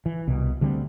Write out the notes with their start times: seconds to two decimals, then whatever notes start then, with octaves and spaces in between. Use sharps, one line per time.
0.06 E3
0.28 C2 B2
0.61 D2 D3 G3 C4